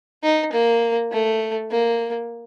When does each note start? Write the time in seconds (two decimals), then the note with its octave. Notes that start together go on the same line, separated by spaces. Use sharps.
0.23 D#4
0.53 A#3
1.12 A3
1.71 A#3